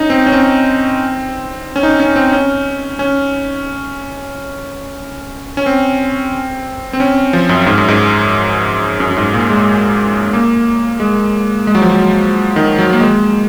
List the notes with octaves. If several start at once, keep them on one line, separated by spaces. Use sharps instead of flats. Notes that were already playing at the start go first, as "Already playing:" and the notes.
Already playing: C#4 D#4
C4
C#4
C4
C#4
D#4
C#4
C4
C#4
C#4
C#4
C4
C4
C#4
F3
F#2
G#2
F#2
G#2
F#2
F#2
G#2
A#2
G#3
A#3
G#3
G#3
F#3
F3
F#3
D#3
F#3
A#3
G#3